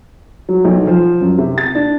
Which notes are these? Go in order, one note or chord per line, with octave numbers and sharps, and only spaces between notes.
F#3
B1
F3
F#2
C3
A6
D4